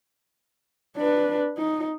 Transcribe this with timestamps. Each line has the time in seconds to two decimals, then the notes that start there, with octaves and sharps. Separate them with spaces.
0.97 D4 B4
1.58 D#4